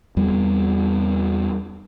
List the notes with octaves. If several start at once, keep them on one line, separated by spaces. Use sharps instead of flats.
E2 G3 B3